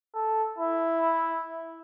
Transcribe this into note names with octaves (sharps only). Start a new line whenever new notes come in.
A4
E4